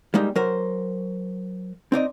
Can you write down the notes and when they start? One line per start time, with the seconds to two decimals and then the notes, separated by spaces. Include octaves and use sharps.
0.14 G3 G#3 A#3 D#4
0.36 F#3 A#4 C5
1.92 C4 D#4 D5 D#5